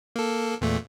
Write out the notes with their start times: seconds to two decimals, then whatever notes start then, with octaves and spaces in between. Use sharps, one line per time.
0.16 A#3 A4
0.61 E2 A#2 A3